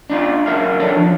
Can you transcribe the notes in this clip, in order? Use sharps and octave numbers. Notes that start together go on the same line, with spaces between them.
D4 D#4 F4
F#3 A#4 E5 F5
D4 D#4 A4 C#5 D5
F3